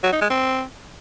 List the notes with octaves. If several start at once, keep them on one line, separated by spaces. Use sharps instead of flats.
F#3
D#4
G#3
C4